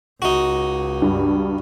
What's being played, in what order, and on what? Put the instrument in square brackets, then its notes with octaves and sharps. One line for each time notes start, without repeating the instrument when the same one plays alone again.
[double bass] C#2 [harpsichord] D#4 F#4
[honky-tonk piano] G2